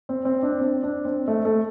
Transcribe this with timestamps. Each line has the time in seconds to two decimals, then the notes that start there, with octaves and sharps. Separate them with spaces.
0.09 C4
0.25 C4
0.43 D4
0.60 C4
0.83 D4
1.05 C4
1.28 A3
1.45 A3